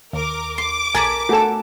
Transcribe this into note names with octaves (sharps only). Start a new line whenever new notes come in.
D#2 A#4 D6
C6 D6
B1 A#4 D5 G#5 A5 B6
A3 F#4 A4 G#5 E7